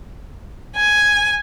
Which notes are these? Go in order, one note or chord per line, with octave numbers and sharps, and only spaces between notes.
G#5